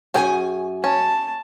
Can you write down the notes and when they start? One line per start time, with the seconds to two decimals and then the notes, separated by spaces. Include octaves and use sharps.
0.14 F#2 C#4 G#4 A4 G5 G#5
0.84 C#4 A5